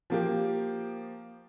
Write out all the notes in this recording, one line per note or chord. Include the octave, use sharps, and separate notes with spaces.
F3 A#3 G4